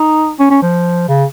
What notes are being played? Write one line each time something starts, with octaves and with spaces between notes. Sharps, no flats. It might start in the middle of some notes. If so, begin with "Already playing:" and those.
Already playing: D#4
C#4
C#4
F3
C#3